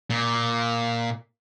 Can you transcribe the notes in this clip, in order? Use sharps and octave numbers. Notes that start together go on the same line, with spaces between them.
A#2